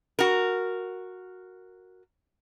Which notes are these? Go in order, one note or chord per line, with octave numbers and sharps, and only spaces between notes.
F#4 A#4